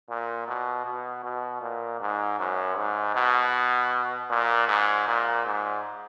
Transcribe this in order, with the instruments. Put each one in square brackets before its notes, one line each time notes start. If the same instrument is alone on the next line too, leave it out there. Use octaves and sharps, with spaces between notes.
[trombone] A#2
B2
B2
B2
A#2
G#2
F#2
G#2
B2
A#2
G#2
A#2
G#2